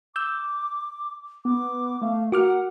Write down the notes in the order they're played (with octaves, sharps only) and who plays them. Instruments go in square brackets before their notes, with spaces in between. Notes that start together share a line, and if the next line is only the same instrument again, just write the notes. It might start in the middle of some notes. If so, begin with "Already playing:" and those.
[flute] D6 [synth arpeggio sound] E6 G6
[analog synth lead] B3 [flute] D6
[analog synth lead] A3 [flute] F5
[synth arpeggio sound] F#4 D6 F6 [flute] A#4 [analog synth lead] F#5